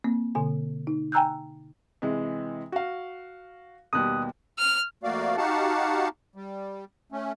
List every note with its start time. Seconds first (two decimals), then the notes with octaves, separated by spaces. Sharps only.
0.04 A#3 C4
0.35 B2 D3 G#5
0.87 D#4
1.12 G5 G#5 A#5 E6 F#6 G6
2.02 C3 E3 G#3
2.72 F#4 F5
3.93 D#2 B2 G3 D#6 F#6
4.59 F6
5.03 F2 A3 A#3 F#4 D5 F5
5.37 D#4 F#4 G4 F5 F#5 A5
6.36 G3
7.12 A3 C#4